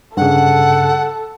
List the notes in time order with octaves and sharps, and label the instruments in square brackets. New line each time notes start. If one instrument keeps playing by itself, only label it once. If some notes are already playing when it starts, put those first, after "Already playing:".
[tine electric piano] G2 C#3 [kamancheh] A4 [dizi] F#5